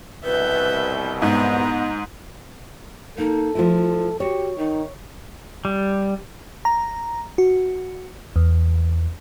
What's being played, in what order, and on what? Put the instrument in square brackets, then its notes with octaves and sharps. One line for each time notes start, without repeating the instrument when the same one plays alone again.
[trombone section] C2 B2 [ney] B4 [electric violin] E5 G6
[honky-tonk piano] G#2 [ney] B3 [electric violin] A#5
[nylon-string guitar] A#3 [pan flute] D#4 [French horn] A4
[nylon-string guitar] F3 A3 E4 [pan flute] F4
[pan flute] F#4 [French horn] G4 [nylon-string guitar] C#5
[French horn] D#3 [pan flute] D#4
[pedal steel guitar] G3
[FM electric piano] A#5
F#4
E2